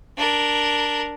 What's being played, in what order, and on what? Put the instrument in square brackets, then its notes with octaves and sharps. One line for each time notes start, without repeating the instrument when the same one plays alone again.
[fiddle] D4 A#4